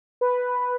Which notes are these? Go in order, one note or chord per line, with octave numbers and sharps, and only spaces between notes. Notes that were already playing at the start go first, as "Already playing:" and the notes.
B4